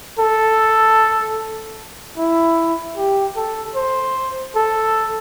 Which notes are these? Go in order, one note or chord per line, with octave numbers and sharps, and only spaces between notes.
A4
E4
G4
A4
C5
A4